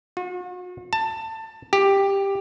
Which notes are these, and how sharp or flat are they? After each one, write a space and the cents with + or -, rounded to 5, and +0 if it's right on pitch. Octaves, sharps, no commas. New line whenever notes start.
F#4 -45
A5 +20
G4 +10